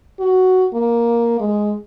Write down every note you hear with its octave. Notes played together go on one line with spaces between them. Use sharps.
F#4
A#3
G#3